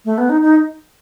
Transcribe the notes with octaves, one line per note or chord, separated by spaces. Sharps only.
A3
B3
D#4
D#4